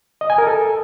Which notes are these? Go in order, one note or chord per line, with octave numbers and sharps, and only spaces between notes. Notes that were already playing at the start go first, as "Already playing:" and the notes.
D#5
G#5
A#4
A4